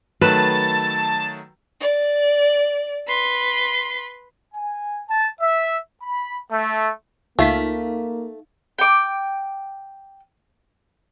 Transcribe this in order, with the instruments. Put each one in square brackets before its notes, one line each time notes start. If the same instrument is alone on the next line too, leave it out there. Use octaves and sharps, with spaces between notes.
[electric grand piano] D#3 F#3 A3 [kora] B4 [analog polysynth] A5
[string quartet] D5
B4 C6
[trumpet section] G#5
A5
E5
B5
A3
[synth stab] C#2 F4 B6 [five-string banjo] A3 [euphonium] A#3 [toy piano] D#4 F5 C#6
[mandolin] G5 D6